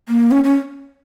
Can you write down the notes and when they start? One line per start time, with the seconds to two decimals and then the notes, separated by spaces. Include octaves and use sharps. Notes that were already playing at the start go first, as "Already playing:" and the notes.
0.09 A#3
0.31 C#4
0.44 C#4